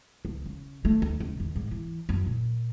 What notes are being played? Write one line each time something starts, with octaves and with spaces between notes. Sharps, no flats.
C#2
C#3
A3
D2
C#2
D#2
G#2
E3
F#2
A#2